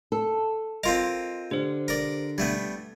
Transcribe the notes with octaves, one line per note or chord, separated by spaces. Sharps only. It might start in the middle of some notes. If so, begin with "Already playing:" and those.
A4
C4 F4 A#4 D#5 C6
D3 G4 C5
A#4 D5
G3 A3 B3 G#6